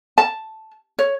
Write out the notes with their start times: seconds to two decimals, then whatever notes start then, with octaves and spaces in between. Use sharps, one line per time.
0.18 A5
0.99 C#5